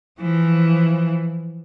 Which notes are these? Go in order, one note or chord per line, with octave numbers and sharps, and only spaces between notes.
E3 F3